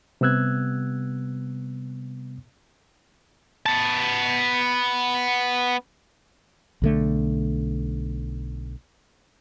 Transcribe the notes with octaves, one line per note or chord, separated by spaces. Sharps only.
C3 G3 B3 E6 F#6 G#6
B3 A5
B1 D3 A3